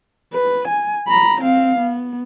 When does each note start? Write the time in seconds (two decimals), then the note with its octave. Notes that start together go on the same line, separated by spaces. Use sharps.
0.34 B4
0.69 G#5
1.08 A#5 B5
1.42 C4 F5
1.78 B3